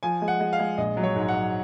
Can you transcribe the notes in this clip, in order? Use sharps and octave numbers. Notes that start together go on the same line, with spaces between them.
F3 G#5
G#3
F#5
G#3
F5
G#3
A#1 D#5
F#3
C#5
G#2
F#5
F#3